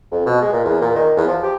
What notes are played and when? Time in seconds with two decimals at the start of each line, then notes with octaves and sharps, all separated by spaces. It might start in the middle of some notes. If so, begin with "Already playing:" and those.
0.12 F2
0.26 B2
0.42 G#3
0.53 A#2
0.64 E2
0.81 A#2
0.96 D#3
1.17 E2
1.28 F3
1.43 G4